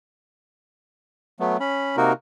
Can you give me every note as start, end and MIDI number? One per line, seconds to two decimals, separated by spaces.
1.40 1.57 54
1.40 1.57 57
1.40 1.57 59
1.60 1.96 61
1.60 1.96 83
1.97 2.13 48
1.97 2.13 58
1.97 2.13 63
1.97 2.13 66
1.97 2.13 70